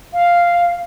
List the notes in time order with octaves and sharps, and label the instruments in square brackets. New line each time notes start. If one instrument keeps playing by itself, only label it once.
[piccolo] F5